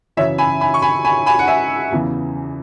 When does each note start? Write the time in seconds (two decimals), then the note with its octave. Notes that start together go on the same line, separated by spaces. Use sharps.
0.17 F#2 C#3 E3 C#5 E5
0.38 G#5 B5
0.61 G#5 B5
0.74 C#6
0.82 G#5 B5
1.05 G#5 B5
1.26 G#5 B5
1.39 F#5
1.48 E5 G#5
1.91 E2 C#3 E3